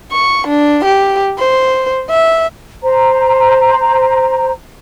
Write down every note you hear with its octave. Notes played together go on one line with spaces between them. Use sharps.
C#6
D4
G4
C5
E5
C5 A#5